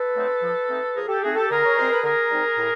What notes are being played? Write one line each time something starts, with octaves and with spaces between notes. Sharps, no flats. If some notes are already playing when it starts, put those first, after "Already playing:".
Already playing: A4 B4
F#3 A3 C4 D#4
F3
A3 C4 D#4
F3 G#4 A#4
G4 A4
A3 C4 D#4 F#4 G#4
G4 A4
D3 G#4 A#4
C#5
G3 C4 D#4 C5
B4
D3 G#4 A#4
G3 C4 D#4
A2